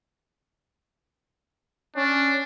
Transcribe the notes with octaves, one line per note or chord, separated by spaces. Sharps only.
C#4 D4